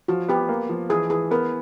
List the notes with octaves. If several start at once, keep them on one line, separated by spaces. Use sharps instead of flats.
F3 F#4
B3 G4
A#3
F3
E3 G#4
E3 G#4
B3 A#4